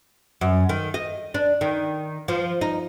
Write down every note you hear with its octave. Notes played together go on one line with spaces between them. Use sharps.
F#2
D#3
D#5
D4
D#3
F3
D#4